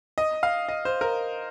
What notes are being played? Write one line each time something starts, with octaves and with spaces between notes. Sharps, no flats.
D#5
F5
D#5
C5
A#4